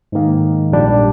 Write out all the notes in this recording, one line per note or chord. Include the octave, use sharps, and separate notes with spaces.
G#2 D#3 A#3
A#1 A#2 G3 D4 G4